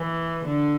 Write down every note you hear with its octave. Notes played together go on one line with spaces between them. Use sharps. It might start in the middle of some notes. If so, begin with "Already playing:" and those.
Already playing: E3
D3